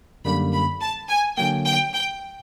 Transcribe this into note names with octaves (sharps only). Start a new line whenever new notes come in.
F#2 D3 G3 A#3 B5
B5
A5
G#5
D3 F#3 A#3 G5
G5
G5